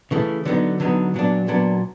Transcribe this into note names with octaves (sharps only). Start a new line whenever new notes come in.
C#3 E3 A3
D3 F#3 B3 D#4
D3 F#3 B3 D#4
A#2 F#3 B3 D4
A#2 F#3 B3 D4